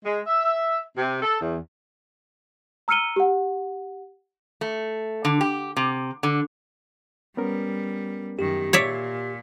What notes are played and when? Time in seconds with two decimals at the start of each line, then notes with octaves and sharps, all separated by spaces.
0.05 G#3
0.25 E5
0.96 C3
1.21 A4
1.40 E2
2.88 A#5 E6 F6 C#7 D#7 G7
3.16 G4 F#5
4.61 A3
5.25 D3
5.41 G4
5.77 C3
6.23 D3
7.37 G3 B3 C#4 A#4
8.39 F#2 D#3 G4
8.73 A#2 C#5 D5 E5